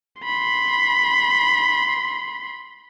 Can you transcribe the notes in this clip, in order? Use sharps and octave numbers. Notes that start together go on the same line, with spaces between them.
B5 C6